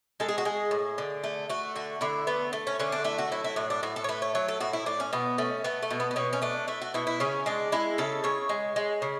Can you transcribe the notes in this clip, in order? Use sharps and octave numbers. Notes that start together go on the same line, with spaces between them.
G#3 A4
G#4
F#4
G#3 G#4
A2
D3
A3
A3 F#4
D3 F#4
D3 E4
A3 B3
A3
C#4
D3 C#4
D4
A3 E4
F#4
F#3 E4
E4
A2 D4
D4
A2 F#4
A4
C#5
A3 B4
C#5
F#3 C#5
A4
A2 F#4
E4
A2 D4
C#4
B2 B3
A3 C#4
A3 B3
A3
B2
B3
B3
B2 C#4
C#4
A3 D4
A3 E4
F#4
B2 E4
E4
C#3 C#4
G#3 D4
G#3 E4
C#3 A4
C#3 C#5
G#3
G#3
C#3